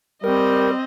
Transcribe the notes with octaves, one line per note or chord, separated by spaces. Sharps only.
G3 C4 A#4 D#5